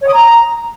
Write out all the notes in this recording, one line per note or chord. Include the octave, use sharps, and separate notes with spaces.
C#5
D#6
A#5